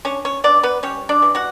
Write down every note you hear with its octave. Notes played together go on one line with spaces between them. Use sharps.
C#4 D4 C#5
C#4 C#5
B3 D4 D5
B3 B4
G3 C#4 C#5
D4 D5
E3
F#4 F#5